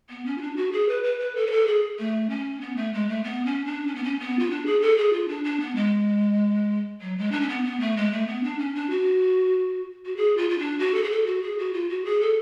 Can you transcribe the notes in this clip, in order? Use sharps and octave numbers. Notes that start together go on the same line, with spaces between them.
B3
C#4
F4
D4
F#4
G#4
B4
B4
B4
A4
B4
A4
G#4
A3
C#4
B3
A3
G#3
A3
B3
C#4
D4
C#4
B3
C#4
B3
F4
D4
G#4
A4
G#4
F4
D4
D4
B3
G#3
F#3
G#3
D4
C#4
B3
B3
A3
G#3
A3
B3
D4
C#4
D4
F#4
F#4
G#4
F4
F4
D4
F#4
A4
G#4
A4
F#4
G#4
F#4
F4
F#4
G#4
A4